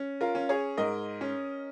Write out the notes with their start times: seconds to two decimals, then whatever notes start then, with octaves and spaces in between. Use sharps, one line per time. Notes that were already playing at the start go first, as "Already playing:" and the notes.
Already playing: C#4
0.21 F4 A#4
0.35 C#4
0.49 G#4 C#5
0.77 G#2 A#4 D#5
1.21 C#4